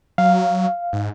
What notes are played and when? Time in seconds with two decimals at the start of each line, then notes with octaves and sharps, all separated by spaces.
0.18 F#3 F5
0.93 G#2